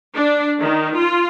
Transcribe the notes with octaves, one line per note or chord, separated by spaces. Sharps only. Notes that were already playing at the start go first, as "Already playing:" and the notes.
D4
D#3
F4